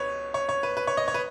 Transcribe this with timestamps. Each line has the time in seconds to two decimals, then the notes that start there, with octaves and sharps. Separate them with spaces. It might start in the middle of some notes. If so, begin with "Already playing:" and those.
Already playing: C#2 B2 B4 C#5
0.34 C#5
0.49 C#5
0.63 B4
0.77 B4
0.87 C#5
0.97 D#5
1.08 C#5
1.14 B4